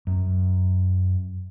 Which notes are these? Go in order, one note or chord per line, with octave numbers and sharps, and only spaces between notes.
F#2